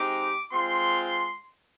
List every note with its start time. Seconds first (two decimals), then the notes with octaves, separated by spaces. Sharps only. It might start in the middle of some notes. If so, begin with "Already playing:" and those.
Already playing: G#3 C4 D#4 G4 D6
0.52 G#3 C4 F4 C6